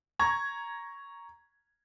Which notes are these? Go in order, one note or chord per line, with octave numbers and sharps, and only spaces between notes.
A#5 C#6 G#6